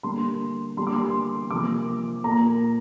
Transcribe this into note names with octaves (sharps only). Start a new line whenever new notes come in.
D3 G3 A#3 C6
D3 G3 A#3 C6
D6
C6
C3 F3 A#3 D6
A#2 A#3 A#5